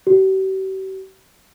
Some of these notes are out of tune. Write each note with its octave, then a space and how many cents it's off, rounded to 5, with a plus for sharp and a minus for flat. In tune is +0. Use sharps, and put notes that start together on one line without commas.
G4 -45